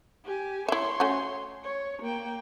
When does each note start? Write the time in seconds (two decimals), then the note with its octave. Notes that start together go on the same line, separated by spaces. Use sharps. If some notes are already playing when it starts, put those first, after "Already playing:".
0.24 G4 G#5
0.68 E4 C#5 E5 C6
1.00 A3 C#4 F#4
1.64 C#5
2.02 A#3 G5